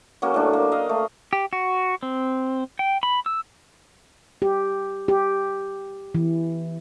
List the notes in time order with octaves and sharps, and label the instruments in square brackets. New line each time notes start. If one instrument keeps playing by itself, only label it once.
[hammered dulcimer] F#3 A#3 C#4
A2 D4
A#3
D#5 F5
A3
[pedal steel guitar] G4
F#4
C4
G5
B5
E6
[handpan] G4
G4
E3